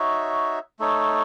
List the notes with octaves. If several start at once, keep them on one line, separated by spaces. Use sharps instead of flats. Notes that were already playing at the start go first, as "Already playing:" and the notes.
Already playing: D#4 F#4 C#5 E5
A3 D#4 A4 C#5